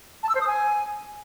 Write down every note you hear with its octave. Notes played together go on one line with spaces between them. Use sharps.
A5
E6
C5
D#6
G#5